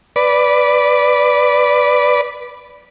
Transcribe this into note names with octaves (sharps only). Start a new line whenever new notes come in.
B4 D5